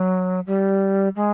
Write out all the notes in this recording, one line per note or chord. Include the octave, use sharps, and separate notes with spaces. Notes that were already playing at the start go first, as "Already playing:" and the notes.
Already playing: F#3
G3
G#3